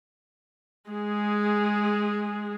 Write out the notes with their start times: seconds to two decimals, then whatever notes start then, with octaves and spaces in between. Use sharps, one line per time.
0.90 G#3 G#4